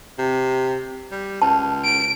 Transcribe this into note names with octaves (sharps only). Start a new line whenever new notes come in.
C3
G3
C#2 A5
D7